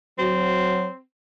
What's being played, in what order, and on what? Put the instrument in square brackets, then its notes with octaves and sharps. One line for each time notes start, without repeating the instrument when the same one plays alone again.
[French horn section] F#3 [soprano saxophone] C4